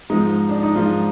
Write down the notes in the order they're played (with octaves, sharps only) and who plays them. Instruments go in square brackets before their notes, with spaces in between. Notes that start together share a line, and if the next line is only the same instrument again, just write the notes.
[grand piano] G#2 F3 G#3 D#4
D4
D#4
G#2 F3 G#3 F4